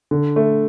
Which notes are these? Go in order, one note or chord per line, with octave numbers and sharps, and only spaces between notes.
D3
A3